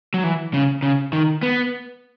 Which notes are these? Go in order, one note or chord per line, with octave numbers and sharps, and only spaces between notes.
F#3
E3
C#3
C#3
D#3
B3